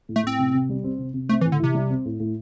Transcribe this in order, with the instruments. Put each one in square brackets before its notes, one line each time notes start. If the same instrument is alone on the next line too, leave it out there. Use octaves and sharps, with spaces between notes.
[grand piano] A2
[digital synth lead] A3
[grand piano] A2 [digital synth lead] C4
[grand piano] C3
C3
G3
C4
C3
C3
[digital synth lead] A3 [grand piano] C4
[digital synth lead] E3
[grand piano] A2
[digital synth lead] D3
[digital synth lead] C3 [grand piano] E3
[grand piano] G3
C4
A2
A2